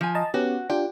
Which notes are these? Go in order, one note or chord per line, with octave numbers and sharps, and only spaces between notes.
F3 G#5
D#5 A5 A#5
B3 C#4 F#4 G4
D4 F4 G4 G5